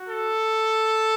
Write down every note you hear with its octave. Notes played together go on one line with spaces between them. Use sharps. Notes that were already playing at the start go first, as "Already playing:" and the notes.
Already playing: F#4
A4